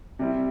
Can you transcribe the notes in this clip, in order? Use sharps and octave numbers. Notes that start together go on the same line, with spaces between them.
C3 G3 C4 E4